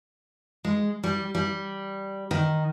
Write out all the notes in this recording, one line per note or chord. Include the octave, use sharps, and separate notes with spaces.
G#3
G3
G3
D#3